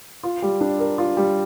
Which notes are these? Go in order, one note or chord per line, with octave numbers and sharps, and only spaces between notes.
F4
G3
D4
A#4
F4
G3